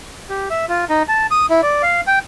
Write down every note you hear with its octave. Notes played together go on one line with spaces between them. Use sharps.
G4
E5
F4
D#4
A5
D#6
E4
D5
F5
G5